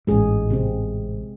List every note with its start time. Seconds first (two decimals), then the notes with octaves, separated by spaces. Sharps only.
0.07 A1 G#2 G#3 G#4
0.50 C3 C4